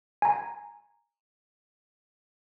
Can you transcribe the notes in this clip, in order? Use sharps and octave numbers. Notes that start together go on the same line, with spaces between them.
G#5 A#5